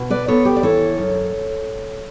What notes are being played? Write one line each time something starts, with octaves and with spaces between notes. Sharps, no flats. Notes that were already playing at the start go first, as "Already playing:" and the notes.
Already playing: B2
B4 D5
B3 A4 C#5
G4 B4
D5
E3 A4 C#5
F#2